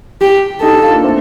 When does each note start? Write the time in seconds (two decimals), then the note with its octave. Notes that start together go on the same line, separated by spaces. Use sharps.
0.21 G4
0.62 D#4 G4 A4
0.72 D#4 G4
0.83 D4 F4
0.93 A#3 D4
1.04 A3 C4